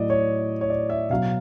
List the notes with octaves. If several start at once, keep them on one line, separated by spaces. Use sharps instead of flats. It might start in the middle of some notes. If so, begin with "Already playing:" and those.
Already playing: A2 F#3 D5 D#5
C#5
C#5
D5
E5
B2 F#3 F5